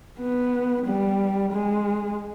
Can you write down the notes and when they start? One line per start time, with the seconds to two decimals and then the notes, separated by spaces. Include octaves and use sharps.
0.20 B3
0.86 G3
1.52 G#3